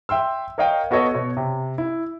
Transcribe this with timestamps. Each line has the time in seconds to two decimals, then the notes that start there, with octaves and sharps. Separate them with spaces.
0.09 E5 G5 C6 E6
0.58 A#4 C#5 D#5 F5 G5
0.91 B3 F#4 A4 C#5 D#5
1.14 B2 C#5
1.37 C3
1.78 E4